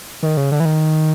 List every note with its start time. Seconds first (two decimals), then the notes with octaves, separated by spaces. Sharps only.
0.23 D#3
0.37 C#3
0.52 D3
0.60 E3
0.65 D#3